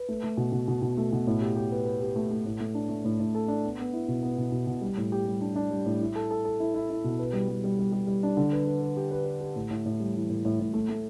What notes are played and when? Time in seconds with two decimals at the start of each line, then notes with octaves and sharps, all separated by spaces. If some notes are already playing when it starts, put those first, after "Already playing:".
Already playing: B4
0.08 A3
0.23 A3
0.37 B2
0.52 B2
0.68 B2
0.82 B2
0.97 A3
1.13 B2
1.27 A2
1.42 G4
1.56 G4
1.72 B4
1.85 B4
2.01 G4
2.16 A3
2.31 A3
2.46 A2
2.60 A3
2.74 D4
2.89 A3
3.05 A2
3.20 A2
3.35 A4
3.48 D4
3.64 B3
3.79 B3
3.93 E4
4.08 B2
4.23 B3
4.38 B2
4.52 B2
4.67 B2
4.81 G3
4.97 A2
5.12 G4
5.26 G3
5.41 D4
5.56 D4
5.71 G3
5.85 A2
6.01 E4
6.15 A4
6.31 A4
6.45 A4
6.60 E4
6.74 E4
6.90 E4
7.04 B2
7.19 B4
7.33 G3
7.49 G3
7.64 G3
7.79 G3
7.92 G3
8.07 G3
8.23 D4
8.37 D3
8.53 B4
8.67 B4
8.82 B4
8.97 G4
9.11 B4
9.26 B4
9.40 G4
9.56 A2
9.70 A2
9.85 A2
10.00 G3
10.15 E3
10.29 A2
10.45 A2
10.60 A2
10.74 A3
10.89 A3